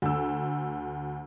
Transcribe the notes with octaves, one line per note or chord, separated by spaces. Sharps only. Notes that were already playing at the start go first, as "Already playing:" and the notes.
D2 E6